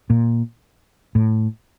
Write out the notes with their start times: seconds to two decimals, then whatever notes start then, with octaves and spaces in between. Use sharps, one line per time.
0.10 A#2
1.15 A2